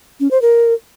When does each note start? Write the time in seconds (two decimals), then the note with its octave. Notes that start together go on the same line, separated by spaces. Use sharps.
0.20 C#4
0.31 C5
0.42 A#4